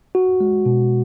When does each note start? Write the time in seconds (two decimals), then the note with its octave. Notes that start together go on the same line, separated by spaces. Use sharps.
0.15 F#4
0.40 G#3
0.66 B2